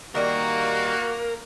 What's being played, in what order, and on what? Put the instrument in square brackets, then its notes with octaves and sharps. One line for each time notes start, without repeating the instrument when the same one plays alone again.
[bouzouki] D#3 G3 A#5 [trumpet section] A#3 [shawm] F#4 [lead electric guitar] A#4